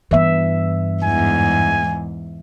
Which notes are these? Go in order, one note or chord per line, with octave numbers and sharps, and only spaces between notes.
G2 E3 B3 E5
E2 G#2 G#5